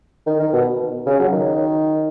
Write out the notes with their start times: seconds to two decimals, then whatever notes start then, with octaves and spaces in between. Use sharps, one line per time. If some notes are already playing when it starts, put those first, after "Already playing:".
0.27 D#3
0.40 D#3
0.53 B2
1.06 C#3
1.20 F#3
1.32 D#3